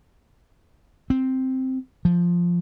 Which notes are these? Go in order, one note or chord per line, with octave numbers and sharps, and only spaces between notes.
C4
F3